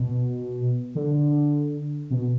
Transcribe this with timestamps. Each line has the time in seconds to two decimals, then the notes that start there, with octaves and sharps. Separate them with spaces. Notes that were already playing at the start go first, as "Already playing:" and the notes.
Already playing: B2
0.95 D3
2.10 B2